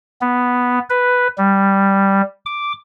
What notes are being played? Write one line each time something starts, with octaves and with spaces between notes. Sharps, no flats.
B3
B4
G3
D6